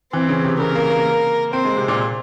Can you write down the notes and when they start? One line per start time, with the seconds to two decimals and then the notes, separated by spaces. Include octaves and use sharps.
0.12 E3 C4
0.29 C#3
0.44 C3
0.59 C#3 A#4
0.75 A#3
0.91 A#3
1.53 C4 C5
1.65 G#3
1.77 C3
1.88 A#2